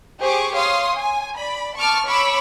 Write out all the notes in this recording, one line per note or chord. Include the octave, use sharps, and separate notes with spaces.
G4 G#4 C5 C#6 D6
C#5 F5 C6 D#6
G#5
D5 B5
A5 C#6 D6 F6
C#5 B5 C#6 D6 E6